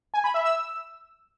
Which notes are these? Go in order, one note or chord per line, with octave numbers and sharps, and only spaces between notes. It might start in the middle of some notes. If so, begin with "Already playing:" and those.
G#5
B5
E5
E6